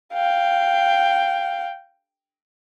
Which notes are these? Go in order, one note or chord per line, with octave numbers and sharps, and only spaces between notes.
F5 G5